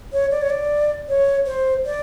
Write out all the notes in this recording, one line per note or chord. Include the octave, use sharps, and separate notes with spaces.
C#5
D5
C#5
D5
C#5
C5
D5